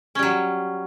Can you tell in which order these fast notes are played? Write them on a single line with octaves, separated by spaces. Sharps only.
C#4 G3 F#3